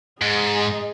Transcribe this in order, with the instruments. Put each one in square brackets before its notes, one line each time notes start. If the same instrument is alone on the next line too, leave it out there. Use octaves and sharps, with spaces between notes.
[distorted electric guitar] G#2 [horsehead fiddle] G#4 D#5